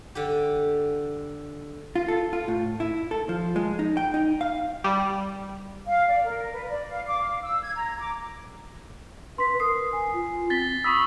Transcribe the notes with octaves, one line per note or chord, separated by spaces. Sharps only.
D3 G4
F4
A4
F4
A2
E4
A4
F3
G#3
D#4
G5
D#4
F5
G3
F5
D5
A#4
B4
D5
F5
D6
F5
E6
G#6
A#5
D6
B4 C6 B6
A#4 D#6 C7
G#5
F4
C4 A6 B6 G7
B5 C#6 D#6 E6 B6